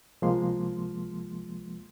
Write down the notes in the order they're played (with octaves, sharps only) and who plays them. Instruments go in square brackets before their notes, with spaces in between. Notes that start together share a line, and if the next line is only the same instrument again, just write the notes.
[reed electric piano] C2 F3 G#3 A#3 C6